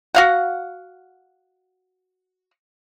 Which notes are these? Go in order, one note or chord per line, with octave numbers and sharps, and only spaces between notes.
F#4 F5 F#5